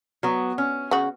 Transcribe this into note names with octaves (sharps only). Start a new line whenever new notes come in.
F#3 B3
C#4
C#3 F#4